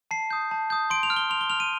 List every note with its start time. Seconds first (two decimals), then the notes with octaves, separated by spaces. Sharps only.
0.11 A5 C7
0.31 D#6 G6
0.51 A5
0.70 D#6 G6
0.90 C6 D7
1.03 F7
1.10 F6
1.16 G7
1.30 C6 F7
1.41 G7
1.50 F6 F7
1.60 D#7